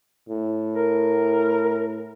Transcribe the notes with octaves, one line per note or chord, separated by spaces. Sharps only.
A2
A#4